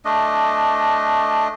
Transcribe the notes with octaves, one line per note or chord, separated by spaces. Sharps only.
A3 D4 D#5